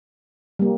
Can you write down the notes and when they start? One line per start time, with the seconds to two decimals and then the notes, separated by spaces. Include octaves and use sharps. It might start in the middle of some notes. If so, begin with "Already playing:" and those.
0.59 G3 A#3